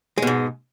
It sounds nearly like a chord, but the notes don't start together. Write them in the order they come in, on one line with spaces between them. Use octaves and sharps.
G#3 B2 G#2